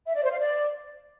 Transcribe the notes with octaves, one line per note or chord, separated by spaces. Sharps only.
E5
D5
C5
F5
D5